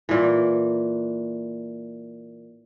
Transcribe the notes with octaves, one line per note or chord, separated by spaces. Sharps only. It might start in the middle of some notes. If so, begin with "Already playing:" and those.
A#2 E3